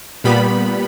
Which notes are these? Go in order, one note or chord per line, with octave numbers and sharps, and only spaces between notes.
A#2 G3 B3 B5